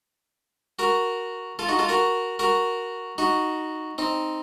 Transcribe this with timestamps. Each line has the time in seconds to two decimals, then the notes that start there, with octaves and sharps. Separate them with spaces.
0.79 F#4 A#4
1.59 F4 A4
1.68 D#4 F#4
1.79 F4 A4
1.89 F#4 A#4
2.39 F#4 A#4
3.18 D#4 F#4
3.98 C4 D#4